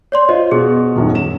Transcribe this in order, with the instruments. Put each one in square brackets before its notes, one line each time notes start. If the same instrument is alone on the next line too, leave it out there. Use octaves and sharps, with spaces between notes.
[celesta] C#5 D5 C6
[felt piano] F4 C5 [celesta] D#5
[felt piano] B2 [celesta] G#4
[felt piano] D#1 F#2 D#3
E7